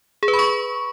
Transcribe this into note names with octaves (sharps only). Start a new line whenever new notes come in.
G#4
B4
B5
C#6